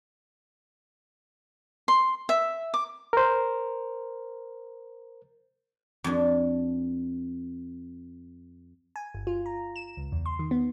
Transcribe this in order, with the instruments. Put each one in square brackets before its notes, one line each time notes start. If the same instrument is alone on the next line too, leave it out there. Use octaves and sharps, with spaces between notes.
[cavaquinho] C6
E5
D6
[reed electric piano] A#4 C5
[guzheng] F2 D4
[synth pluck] G#5
G1
F4
A#5
E7
C#2
E2
C6
D#3
B3